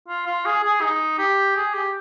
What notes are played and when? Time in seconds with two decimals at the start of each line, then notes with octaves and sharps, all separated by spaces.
0.08 F4
0.26 F4
0.45 G#4
0.64 G#4
0.81 D#4
1.18 G4
1.56 G#4
1.74 G4